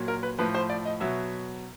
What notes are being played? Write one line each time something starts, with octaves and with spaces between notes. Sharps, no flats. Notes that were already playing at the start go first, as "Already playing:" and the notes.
Already playing: A#2 F#3
A#4
B4
A2 F3 B4
C5
D5
D#5
B2 F#3 E5